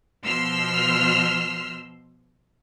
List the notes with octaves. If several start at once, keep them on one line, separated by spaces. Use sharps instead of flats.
B2 F3 C6 E6 F6